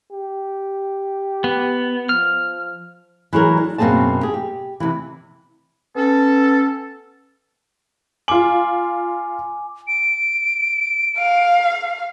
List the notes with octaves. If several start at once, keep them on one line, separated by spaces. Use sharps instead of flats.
G4
B3
F3 F6
E3 F#3 G#4 A#4
D4
F#2 B2 A#3 C4 G#4 A5
G4 G#4
G4
C3 E3
B3 C#4 A4
F4 G#5 D6 F#7
D7
F5